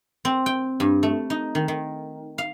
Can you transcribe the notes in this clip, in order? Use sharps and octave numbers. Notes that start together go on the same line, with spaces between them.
C4
G5
G2
A3
D#4
D#3
D#3
F5